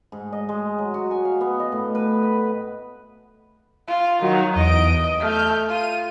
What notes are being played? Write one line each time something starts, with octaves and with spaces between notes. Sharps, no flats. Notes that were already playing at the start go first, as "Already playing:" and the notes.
G#2
D#5
G#3
F#3
F#4
G#5
F5
B3
D#5
A2
B4
B5
F4
D#3 F#3 F#4
E2 D#5 D7
A3 F6 G6
F4 D#7